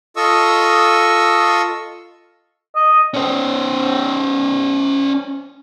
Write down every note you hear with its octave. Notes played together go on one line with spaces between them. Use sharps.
F4 A4 D#5 C#6 D#6 E6
D#5
C#4 C5